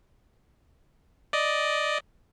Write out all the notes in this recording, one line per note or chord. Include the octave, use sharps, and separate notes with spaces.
D5 D#5